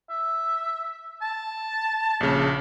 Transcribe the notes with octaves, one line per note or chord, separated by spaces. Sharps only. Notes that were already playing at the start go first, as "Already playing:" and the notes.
E5
A5
A#1 C#3